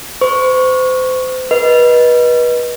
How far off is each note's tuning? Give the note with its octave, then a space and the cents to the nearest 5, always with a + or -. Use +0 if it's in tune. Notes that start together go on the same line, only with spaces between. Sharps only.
C5 -35 C#6 +0
B4 -25 D#5 +5